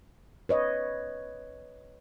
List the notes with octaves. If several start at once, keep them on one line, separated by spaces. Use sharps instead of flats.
B4 C#5 D#5